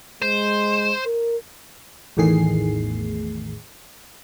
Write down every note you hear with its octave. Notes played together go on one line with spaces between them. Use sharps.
G#3 C5
A#4
A1 E2 A2 D#3 G#4 C7